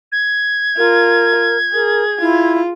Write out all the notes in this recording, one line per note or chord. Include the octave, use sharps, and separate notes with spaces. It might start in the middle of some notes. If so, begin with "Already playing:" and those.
G#6
F4 A#4
G#4 A#4
E4 F4